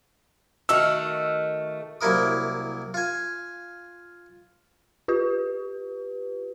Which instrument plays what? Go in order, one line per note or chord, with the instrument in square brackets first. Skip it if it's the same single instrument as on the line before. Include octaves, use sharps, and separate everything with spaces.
[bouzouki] D#3 A3 F#4 [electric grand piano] E6 F6
[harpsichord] C2 F#3 A#3 E4 A#4 D#6
F4 G#5
[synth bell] F4 G4 B4